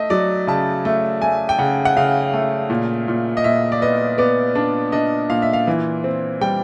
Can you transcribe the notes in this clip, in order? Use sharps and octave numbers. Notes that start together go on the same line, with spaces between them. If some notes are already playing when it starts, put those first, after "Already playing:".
Already playing: A3 D#5 E5
F#3 D5
C#3 A5
A3
A3 G#5
G5
C#3 F#5
F#5
C#3 F5
A3
A#2
A#2
D#5
A#2 E5
D5
B3 D#5
B3 D5
D4
D4 D#5
A#2 F5
E5
F5
E3
C4
G3 G5